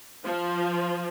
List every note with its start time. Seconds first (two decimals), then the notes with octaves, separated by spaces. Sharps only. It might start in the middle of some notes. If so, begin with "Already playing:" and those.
0.24 F3